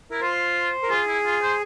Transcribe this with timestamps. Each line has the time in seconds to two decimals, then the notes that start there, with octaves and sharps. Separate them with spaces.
0.11 E4 A#4
0.21 F4 C5
0.83 A#4
0.90 F4 G#4
1.07 E4
1.25 F4
1.42 C5